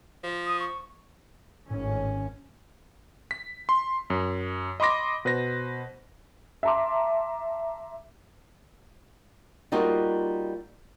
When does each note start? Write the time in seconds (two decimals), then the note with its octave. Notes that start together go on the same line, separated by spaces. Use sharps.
0.23 F3
0.46 D#6
0.60 C#6
1.70 G#1 A2 C#4
3.31 B6
3.69 C6
4.10 F#2
4.80 D#5 B5 C6 D6 A#6
5.25 B2 B4 C5 A#6
6.63 E5 A5 A#5 C6 D6
9.72 G3 A#3 D#4 F4 F#4